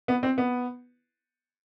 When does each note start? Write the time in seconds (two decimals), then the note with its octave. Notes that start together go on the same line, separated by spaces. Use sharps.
0.08 B3
0.23 C4
0.38 B3